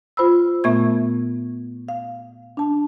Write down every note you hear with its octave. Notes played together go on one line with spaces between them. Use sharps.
F4 C5 B5 E6
A#2 A3 B3 E5 C#6 G#6
F5
D4 A5